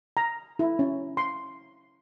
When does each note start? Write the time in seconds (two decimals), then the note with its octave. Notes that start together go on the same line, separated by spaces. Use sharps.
0.17 A#5
0.59 E4
0.79 C#4
1.17 C6